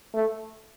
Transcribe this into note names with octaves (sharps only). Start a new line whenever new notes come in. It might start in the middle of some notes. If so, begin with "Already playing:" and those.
A3